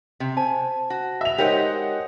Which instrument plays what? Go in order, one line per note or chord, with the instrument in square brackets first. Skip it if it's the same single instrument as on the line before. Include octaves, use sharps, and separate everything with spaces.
[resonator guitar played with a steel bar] C3
[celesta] C5 A5 [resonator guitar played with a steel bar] G#5
[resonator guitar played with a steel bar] F#4
[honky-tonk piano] E5 F7
[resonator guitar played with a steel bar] G#3 D#4 G4 [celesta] A#4 C#5 [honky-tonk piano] C5 D#5 F#5